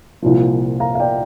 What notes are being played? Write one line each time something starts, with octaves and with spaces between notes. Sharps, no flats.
C2 A#2 F3
F5 A#5
F5
D5 G5